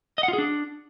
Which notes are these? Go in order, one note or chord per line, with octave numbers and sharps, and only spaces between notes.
D#5
F#5
F4
G#4
D4